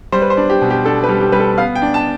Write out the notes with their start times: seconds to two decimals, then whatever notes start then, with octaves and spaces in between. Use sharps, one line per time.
0.12 G3 C5
0.22 B4
0.30 C5
0.37 D4
0.50 G4
0.62 B2
0.70 G4
0.85 D4 A4
1.04 B4
1.09 G3
1.21 G4
1.32 G3 B4
1.40 A4
1.58 B3 F5
1.75 G5
1.82 D4
1.94 A5